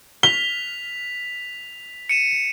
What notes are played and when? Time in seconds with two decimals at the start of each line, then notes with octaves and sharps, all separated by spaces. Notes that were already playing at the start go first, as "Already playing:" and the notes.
0.23 B6 F7 G7
2.09 C#7 D#7 E7